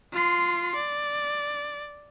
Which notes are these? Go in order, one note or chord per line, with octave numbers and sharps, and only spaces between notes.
F4 C6
D5